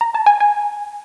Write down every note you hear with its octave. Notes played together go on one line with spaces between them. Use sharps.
A#5
A5
G#5
G#5